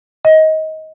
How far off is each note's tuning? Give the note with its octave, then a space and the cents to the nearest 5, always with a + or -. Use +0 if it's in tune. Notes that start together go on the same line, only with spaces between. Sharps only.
D#5 +20